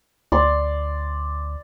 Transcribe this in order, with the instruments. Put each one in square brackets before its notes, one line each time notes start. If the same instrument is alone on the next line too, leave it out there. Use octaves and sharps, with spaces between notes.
[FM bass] D2 [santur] D5 C6